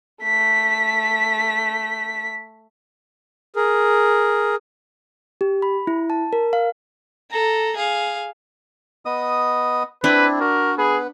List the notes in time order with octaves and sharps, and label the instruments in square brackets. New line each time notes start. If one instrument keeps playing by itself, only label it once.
[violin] A3 B6
[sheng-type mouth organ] G#4 A#4
[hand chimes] G4
B5
E4
A5
A#4
F5
[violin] A4 A#5
G#4 F5
[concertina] B3 D#5 D#6
[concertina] C4 E4 [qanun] D4 [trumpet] B4
[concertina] F#4 [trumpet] A#4
[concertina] B3 B4 [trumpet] G#4